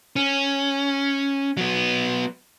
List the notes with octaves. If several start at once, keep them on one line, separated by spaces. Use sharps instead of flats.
C#4
F#3 B3